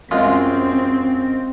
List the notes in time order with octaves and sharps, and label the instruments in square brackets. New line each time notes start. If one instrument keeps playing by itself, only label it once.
[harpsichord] F#2 G#3 F4 [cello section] C4